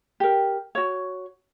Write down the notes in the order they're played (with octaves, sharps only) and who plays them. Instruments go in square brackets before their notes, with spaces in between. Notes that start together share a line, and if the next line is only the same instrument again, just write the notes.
[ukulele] G4 A#4
F#4 C#5